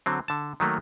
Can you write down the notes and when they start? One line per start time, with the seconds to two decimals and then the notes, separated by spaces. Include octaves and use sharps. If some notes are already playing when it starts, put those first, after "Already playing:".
0.06 D3 F#3 C4
0.28 D3 A5
0.60 D#3 F#3 A3 A#3